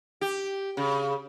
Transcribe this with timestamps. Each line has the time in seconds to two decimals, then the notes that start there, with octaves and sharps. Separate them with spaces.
0.21 G4
0.77 C#3